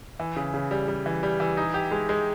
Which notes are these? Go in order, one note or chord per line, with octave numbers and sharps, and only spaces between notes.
E3
C#3
C#3
G3
G3
E3
G3
E3
D#4
G4
G#3
G#3